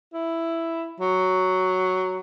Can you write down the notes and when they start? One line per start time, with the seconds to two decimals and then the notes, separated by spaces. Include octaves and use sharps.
0.14 E4
1.00 F#3